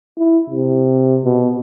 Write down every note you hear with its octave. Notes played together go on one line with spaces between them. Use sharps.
E4
C3
B2